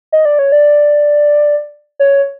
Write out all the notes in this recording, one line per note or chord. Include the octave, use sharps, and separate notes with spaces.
D#5
D5
C#5
D5
C#5